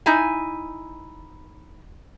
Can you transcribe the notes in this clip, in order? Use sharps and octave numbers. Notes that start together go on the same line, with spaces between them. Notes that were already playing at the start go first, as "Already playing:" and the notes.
D#4 E4 G#5